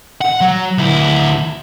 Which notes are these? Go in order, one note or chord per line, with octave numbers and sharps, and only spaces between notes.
F#5
F#3
D2 E4